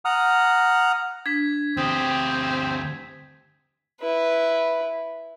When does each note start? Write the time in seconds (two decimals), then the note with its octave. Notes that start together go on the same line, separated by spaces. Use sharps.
0.05 F#5 A#5 D#6 F6
1.26 D4 G#6 B6
1.77 D2 C4 G4 D#6
4.00 E4 B4